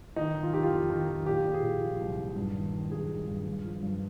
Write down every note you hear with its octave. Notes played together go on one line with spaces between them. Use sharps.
D#3 D#4
D#3
F4
D#3 G4
F4
F2
D#3
D#3
A#2 G4
A#2
G#4
A#2
F3
C2
A#2
G2
D#3
D#3
G2 G#4
D#3
G2
G2
F3
G2